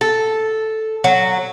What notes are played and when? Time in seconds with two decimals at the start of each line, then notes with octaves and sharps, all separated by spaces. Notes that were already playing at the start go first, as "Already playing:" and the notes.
0.01 A4
1.04 F#3